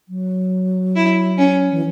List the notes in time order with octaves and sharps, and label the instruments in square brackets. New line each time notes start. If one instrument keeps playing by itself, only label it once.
[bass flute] F#3
[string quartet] E4
C#4
[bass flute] E3